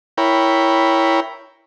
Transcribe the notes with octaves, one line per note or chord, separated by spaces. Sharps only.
E4 A#4 C#5 G5 B5